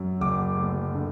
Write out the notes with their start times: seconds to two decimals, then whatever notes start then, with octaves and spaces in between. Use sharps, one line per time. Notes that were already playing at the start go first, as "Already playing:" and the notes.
Already playing: F#2
0.20 F#1 D6
0.57 D2
0.94 D3